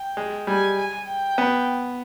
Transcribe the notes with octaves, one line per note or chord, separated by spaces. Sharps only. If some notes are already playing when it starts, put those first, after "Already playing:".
Already playing: G5
G#3
G3 G#5
G#5
G5
B3